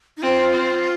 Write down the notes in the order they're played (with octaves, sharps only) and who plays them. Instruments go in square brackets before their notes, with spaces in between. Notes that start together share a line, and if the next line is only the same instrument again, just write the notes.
[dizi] D#4
[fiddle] C4 [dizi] F4
[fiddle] C4